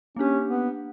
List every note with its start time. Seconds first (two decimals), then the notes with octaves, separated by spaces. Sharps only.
0.16 A#3 C#4 D4 G4
0.48 B3